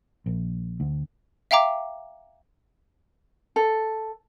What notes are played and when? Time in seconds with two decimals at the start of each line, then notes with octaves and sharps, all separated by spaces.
0.26 A#1
0.80 D2
1.51 E5 F5 G5 A#5 D6
3.56 A4